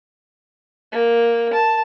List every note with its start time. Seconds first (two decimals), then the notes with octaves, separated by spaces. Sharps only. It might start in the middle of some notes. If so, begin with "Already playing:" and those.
0.92 A#3
1.53 A5